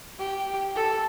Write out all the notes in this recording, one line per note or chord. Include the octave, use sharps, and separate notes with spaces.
G4
A4